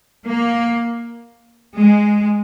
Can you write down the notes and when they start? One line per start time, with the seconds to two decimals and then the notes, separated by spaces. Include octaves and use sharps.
0.26 A#3
1.78 G#3